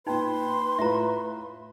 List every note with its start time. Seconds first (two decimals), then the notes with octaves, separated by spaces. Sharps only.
0.07 A#2 D#4 B4 G5 C6
0.78 A2 F4 E5 A#5